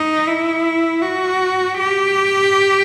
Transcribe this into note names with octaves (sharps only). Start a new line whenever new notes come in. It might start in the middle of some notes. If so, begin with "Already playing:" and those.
Already playing: D#4
E4
F#4
G4